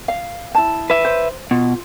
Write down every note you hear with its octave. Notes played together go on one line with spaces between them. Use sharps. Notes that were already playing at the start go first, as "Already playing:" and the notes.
F5
E4 A5
B4 E5
C5
B2 F4